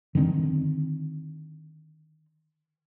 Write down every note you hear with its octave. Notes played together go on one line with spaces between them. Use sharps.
D3 D#3 G3 C4